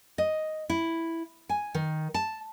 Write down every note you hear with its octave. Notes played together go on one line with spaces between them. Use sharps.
D#5
E4
G#5
D#3
A5